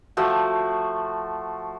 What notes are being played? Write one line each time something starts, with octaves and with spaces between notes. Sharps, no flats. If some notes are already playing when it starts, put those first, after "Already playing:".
F3 A3 F#4